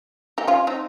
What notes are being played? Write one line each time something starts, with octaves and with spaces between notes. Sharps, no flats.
D#4 G4
C#4 F4
C4 D#4